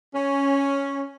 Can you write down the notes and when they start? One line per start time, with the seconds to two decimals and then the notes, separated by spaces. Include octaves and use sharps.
0.14 C#4